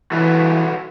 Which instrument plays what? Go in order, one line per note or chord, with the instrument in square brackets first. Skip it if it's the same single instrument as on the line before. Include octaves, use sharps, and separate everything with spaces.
[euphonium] E3 [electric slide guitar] F#4 A4 B4